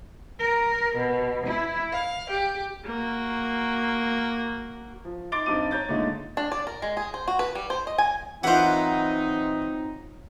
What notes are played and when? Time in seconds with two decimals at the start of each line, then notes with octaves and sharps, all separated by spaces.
0.39 A#4
0.94 B2
1.44 E4
1.92 F5
2.28 G4
2.86 A#3 F#4
5.05 F3
5.32 D#4 C6 D6 A6 D7 G7
5.46 G2 C4 D#4 D6 D#7
5.71 C#5 A#5 G6 A6
5.88 A#2 D3 G#3 A3 D#4
6.37 D4
6.52 D5
6.67 A#4
6.82 G#3
6.97 G#4
7.14 C5
7.28 F#4
7.39 B4
7.55 G3
7.70 C5
7.87 D#5
7.98 G#5
8.44 E3 F#3 C4 D#4 F4 A#4 C5 F#5